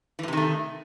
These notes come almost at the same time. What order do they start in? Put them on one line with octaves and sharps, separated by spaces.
E3 A2 C3 D#3 A3